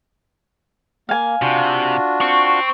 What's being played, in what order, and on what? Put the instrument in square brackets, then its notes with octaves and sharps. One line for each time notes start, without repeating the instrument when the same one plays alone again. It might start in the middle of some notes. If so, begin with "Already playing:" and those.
[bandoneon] A#3 [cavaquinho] F5 G#5
[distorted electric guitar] C3 [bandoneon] D4 F4 F#4
[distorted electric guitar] C4 [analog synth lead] C#6